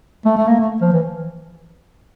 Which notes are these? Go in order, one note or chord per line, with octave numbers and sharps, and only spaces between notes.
A3
A3
A#3
A3
F3
E3